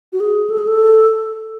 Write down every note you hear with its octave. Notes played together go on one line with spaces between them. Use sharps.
F#4
G#4
A4
G#4
A4